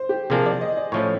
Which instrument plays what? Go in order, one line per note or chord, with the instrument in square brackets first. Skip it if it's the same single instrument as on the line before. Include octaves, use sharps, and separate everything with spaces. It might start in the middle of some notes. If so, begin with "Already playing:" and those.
Already playing: [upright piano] C5
G4
[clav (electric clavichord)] C3 F3 A#3 D4 [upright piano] G#4
[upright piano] D5
D#5
D5
[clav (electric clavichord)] A2 F3 A3 C#4 [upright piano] C#5